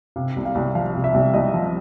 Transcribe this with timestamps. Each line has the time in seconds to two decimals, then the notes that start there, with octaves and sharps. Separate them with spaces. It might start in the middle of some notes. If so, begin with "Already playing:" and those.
0.16 C3 F5
0.36 C2
0.45 F5
0.55 C2
0.75 F3 F5
0.95 C3
1.04 E5
1.14 C2
1.34 C2 D#5
1.54 F3